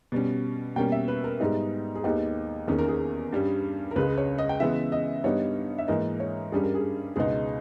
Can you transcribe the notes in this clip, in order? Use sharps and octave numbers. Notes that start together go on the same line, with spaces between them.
B2 G3 C#4
B2 G3 A#3 C#4 G5
E5
B4
A#4
G#2 G3 B3 D#4 G#4
G#4
D#2 D#3 G#3 B3 D#4 G4
E2 D#3 A#3 C#4 G#4
A#4
G#4
G2 G3 C#4
A#4
C#2 C#3 G#3 B4
C#5
D#5
G5
C#3 E3 G#3 B3 E5
D#5
G2 G3 B3 D#4 C#5
E5
G#2 E3 A#3 D#4 D#5
C#5
G2 G3 C#4 G#4
A#4
G#4
C#2 B2 G#3 B3 D#4 G#4